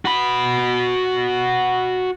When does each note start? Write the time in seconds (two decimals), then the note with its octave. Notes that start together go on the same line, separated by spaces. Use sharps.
0.05 F#4 B5